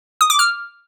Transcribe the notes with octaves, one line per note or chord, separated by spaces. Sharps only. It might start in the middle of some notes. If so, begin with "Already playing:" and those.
D#6
D6
F6